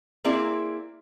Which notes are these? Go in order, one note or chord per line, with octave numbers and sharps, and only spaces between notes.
A#3 C4 E4 G#4 D5